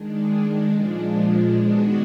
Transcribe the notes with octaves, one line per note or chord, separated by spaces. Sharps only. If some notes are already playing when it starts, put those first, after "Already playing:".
Already playing: D#3 G#3 D4
A#2 F3 G#3 D4
D#3 G#3 B3 D4 F#4